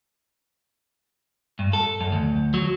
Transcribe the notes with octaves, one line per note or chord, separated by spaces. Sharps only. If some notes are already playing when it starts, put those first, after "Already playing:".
G2
A4
F#2
D2
F#3